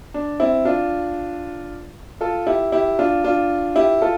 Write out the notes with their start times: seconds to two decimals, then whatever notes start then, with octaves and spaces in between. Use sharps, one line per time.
0.14 D4
0.40 C4 E4
0.65 D4 F4
2.21 F4 A4
2.47 E4 G4
2.72 E4 G4
2.99 D4 F4
3.24 D4 F4
3.76 E4 G4
4.02 F4 A4